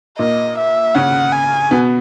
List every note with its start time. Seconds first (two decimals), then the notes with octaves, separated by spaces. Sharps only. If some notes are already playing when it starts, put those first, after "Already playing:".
0.18 A#2 A#3 D#5
0.58 E5
0.95 C#3 C#4 F#5
1.33 G#5
1.71 B2 B3